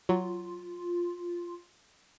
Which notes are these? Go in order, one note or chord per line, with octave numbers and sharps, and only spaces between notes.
F#3 F4